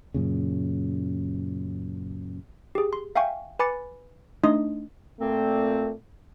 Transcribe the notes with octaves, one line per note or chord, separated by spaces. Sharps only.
F#2 A#2 C#3
G4 G#4
C6
E5 F5 G5 G#5 C#6
B4 G#5 B5 D6 A6 C#7
A3 D4 D#4 D#5 C6 D#6
A#2 A3 C4